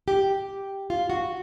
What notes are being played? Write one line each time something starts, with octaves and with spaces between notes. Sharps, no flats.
G4
F4
F#4